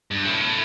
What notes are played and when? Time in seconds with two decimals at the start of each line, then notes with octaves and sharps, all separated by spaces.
0.11 G2
0.25 A2